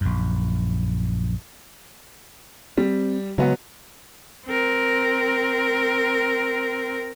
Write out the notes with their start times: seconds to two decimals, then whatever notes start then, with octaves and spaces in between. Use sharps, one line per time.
0.01 A#1 F#2
2.77 G3 C4
3.38 C#3 F#3 G#3 B3
4.47 C4 A#4